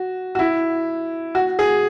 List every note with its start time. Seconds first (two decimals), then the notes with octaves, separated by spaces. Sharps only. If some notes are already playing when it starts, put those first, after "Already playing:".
Already playing: F#4
0.35 F#4
0.39 E4
1.35 F#4
1.59 G#4